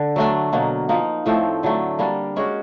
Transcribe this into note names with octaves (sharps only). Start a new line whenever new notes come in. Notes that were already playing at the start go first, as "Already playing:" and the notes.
Already playing: D3
F#3 A3 D4
B2 F#3 A#3
F3 A#3 D#4
A2 F3 A3 C4
D3 F#3 A3
G3 A#3 D4
G#3 C#4 F#4